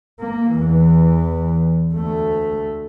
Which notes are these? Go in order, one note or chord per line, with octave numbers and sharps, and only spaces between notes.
A#3
E2 E3
D2 A3